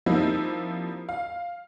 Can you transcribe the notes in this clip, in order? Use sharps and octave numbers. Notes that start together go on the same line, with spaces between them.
F3 G3 A#3 C4 D#4 E4
F5